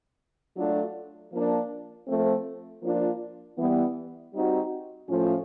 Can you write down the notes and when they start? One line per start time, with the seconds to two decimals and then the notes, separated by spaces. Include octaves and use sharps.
0.56 F#3 A3 D4 F4
1.32 F3 A#3 D4
2.07 F3 A3 C4
2.82 F3 A#3 D4 F4
3.58 E3 G3 B3
4.33 G3 C4 D#4 F#4
5.09 A2 F3 A3 C#4 F4